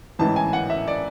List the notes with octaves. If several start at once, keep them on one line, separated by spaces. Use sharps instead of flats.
A1 G#2 E3 A5
G#5
F#5
E5
D5